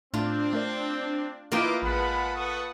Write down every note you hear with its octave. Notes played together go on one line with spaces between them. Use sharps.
A2 A3 C4 D4 F4 A5
A3 A#4 D5
A#3 E4 F4 B4 D#5 F5 G5 D6
A1 G#3 B4 F#5 A5 B5
A4 C#6 D#6